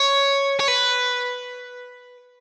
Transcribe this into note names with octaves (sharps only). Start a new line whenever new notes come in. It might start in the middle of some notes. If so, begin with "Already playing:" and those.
Already playing: C#5
C#5
B4